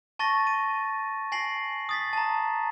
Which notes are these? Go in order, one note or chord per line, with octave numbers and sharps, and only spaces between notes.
A5 C#6 A6 A#6
D#7
G#5 A#6 C7 F#7
D#6 A6 B6
A5 A#5